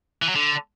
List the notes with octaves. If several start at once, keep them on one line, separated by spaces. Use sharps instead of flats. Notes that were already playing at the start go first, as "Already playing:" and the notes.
E3
F#3
D3